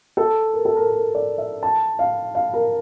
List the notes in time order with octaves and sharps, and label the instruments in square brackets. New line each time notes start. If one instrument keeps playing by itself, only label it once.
[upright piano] A4
A#4
A4
A#4
A#4
D5
E5
A5
F5
F5
A#4